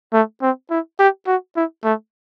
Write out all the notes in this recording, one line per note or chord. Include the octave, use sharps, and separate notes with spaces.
A3
C4
E4
G4
F#4
E4
A3